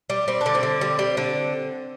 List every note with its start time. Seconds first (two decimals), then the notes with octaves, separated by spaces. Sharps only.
0.10 G3
0.28 G3 C4
0.41 D3 D4
0.55 C4
0.63 D3
0.81 G3
0.99 G3
1.17 D3